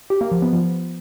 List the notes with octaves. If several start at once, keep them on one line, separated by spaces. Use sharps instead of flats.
G4
A#3
F3
B3
F3